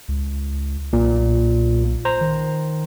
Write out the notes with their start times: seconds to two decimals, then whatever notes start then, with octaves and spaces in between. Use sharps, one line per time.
0.08 C#2
0.93 B1 A#2
2.05 C5 A#5
2.21 D#3